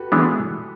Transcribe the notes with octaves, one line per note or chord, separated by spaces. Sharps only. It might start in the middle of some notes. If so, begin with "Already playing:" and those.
Already playing: F#4 G4 A4 B4
E3 G#3 B3 D4